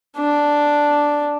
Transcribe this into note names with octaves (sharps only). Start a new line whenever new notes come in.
D4